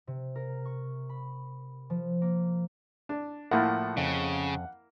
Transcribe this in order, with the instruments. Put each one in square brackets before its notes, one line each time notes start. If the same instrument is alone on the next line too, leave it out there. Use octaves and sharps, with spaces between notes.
[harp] C3
A#4
C#6
B5
F3
A#3
[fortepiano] D4
[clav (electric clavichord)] A2 F3 A3 [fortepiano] A#3 E4 [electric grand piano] F#5
[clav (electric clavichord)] F2 [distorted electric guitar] C#3